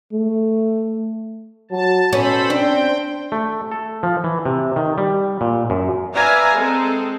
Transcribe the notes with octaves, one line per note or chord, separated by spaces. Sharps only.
A3
F#3 A5
B2 C#4 A4 C5 B5
C4 D4 G5
A3
A4
F3
E3
C3
D#3
G3
A#2
F#2
B4 D5 E5 F5 G#5 A#5
G#3 C4 A4